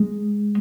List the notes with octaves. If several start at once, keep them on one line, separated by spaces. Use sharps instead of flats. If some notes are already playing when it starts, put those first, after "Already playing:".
Already playing: G#3